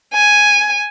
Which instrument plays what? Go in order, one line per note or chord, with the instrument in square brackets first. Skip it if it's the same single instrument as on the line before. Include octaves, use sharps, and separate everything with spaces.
[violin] G#5